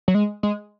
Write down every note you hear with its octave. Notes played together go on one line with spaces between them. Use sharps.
F#3
G#3
G#3